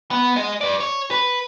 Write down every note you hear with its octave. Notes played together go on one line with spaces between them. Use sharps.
B3
G#4 D#5
B4 D5
C#5
B4